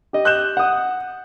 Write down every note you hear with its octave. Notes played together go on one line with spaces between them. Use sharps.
G4 D#5
F#6 G6 E7
F#5 D#6